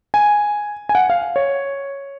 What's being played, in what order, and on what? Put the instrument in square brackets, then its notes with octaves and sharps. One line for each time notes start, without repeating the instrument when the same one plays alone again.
[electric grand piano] G#5
G#5
F#5
F5
C#5